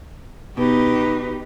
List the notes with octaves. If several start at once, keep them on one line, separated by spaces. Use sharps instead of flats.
B2 D#4 G4 B4